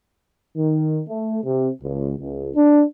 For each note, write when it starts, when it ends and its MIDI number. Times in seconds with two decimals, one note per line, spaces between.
0.56 1.01 51
1.08 1.39 57
1.44 1.69 48
1.82 2.14 37
2.19 2.50 37
2.55 2.83 62